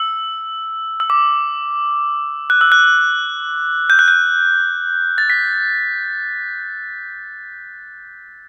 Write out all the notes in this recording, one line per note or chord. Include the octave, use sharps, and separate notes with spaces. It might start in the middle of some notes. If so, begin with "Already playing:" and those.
Already playing: E6
E6
D6
F#6
E6
F#6
G6
F#6
G6
A6
B6